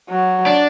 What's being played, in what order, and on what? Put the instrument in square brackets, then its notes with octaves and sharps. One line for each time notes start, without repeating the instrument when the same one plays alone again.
[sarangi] F#3
[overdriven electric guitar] D4